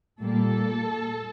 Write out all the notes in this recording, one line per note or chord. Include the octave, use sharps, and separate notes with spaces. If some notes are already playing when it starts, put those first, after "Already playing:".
A#2 G3 A#3 A4